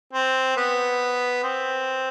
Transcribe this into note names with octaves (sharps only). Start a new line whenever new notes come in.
C4
B3
C4